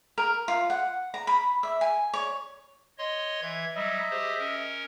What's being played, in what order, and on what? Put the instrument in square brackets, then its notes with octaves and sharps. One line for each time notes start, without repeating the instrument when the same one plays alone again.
[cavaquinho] A#4
F4
F#5
A#5
B5
E5
G#5
C#5
[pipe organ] C#5 D#5 C6
E3 E5 G#6
[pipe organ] F#3 G3 [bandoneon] D#5 E5
[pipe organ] G4 G#4 C5
C#4 A#4